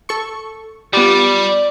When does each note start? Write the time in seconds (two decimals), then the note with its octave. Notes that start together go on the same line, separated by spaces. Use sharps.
0.09 A4 C#6
0.93 G3 B3 F4 G4 D5